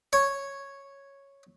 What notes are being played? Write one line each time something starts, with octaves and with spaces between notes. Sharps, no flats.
C#5